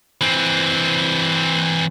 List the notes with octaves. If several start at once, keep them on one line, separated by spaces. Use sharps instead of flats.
E3 C4